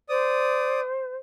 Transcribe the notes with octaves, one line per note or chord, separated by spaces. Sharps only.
C5 D5 D#6